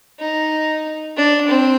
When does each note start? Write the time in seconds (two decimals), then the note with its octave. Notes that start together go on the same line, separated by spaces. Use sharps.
0.19 D#4
1.17 D4
1.48 C4